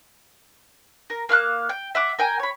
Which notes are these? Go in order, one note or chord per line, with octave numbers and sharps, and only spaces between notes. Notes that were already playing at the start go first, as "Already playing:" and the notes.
A#4
A#3 F5 C6 F#6
G5
E5 F#5 D6
A#4 G5 G#5
C#5 B5